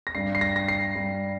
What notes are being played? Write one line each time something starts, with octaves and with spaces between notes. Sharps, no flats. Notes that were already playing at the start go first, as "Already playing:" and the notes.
A#6
G2 G3 C7
C7
A#6
A#6
C7
G2 G3